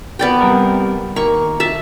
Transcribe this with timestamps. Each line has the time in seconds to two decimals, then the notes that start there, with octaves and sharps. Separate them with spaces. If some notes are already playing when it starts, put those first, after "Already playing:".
0.19 B3 D5 G5
0.41 C3 G3 A#4
1.16 D#3 A#3 C#6
1.60 E5 A5